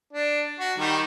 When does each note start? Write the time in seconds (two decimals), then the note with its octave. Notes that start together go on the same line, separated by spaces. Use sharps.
0.13 D4
0.60 F#4
0.78 D#3 G3